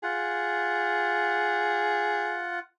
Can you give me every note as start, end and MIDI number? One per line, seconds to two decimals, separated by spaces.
0.03 2.59 65
0.03 2.50 68
0.03 2.59 78